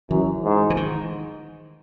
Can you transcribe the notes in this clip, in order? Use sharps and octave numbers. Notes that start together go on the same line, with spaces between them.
F#2 E3
G#2
E3
D#3